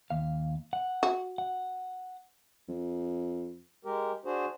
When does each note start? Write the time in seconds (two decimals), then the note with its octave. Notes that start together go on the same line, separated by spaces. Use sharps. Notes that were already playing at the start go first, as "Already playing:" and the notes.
0.10 D#2 F5
0.73 F#5
1.03 F#4
1.38 F#5
2.68 F2
3.85 G#3 G4 A#4
4.25 D4 F#4 G#4 C5